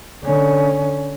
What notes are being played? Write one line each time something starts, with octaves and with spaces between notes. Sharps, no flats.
D3 C#4